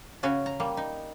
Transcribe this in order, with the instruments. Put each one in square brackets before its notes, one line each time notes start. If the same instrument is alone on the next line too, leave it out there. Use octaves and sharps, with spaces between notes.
[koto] C#3 C#4 F#4
A#5
G3 A#3
D#4